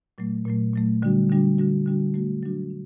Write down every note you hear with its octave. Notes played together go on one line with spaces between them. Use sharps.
A#2 F#3 A3
A#2 F#3 A3
A#2 F#3 A3
D3 G3 D4 F#4
D3 G3 D4 F#4
D3 G3 D4 F#4
D3 G3 D4 F#4
F#3 A3 D4 F#4
F#3 A3 D4 F#4
D4